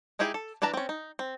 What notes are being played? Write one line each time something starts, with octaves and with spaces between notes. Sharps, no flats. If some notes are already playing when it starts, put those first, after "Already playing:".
G#3 D#4 E4 G4 G#4
A4
E3 D4 B4 A5 A#5
C4 C#4
D#4
C4